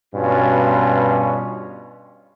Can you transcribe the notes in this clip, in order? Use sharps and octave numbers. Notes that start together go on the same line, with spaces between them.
G2 B2 C#4 F4